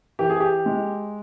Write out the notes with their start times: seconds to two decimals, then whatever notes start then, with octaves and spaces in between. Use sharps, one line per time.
0.19 E3 G4
0.30 G#4
0.40 G4
0.66 G#3